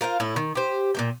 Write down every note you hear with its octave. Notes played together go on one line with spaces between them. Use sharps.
F4 A#4 C5 F5
A2 E4
D#3
G4 C5
A#2 A#3 G5